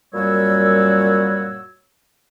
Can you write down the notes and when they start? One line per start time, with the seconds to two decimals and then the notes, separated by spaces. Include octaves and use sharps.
0.14 F#2 A#2 G3 F#4 C#5 E6